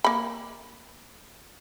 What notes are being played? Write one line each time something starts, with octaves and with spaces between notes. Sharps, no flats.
A#3 B5